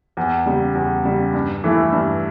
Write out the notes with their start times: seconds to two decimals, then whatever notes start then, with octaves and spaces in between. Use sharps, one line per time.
0.17 E2
0.46 C#3 G3
0.75 E2
1.05 C#3 G3
1.33 G2
1.64 E3 A3 E4
1.92 G2